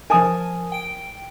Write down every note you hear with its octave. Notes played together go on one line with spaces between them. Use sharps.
F3 A#4 G#5 A5 D#6
G5 D7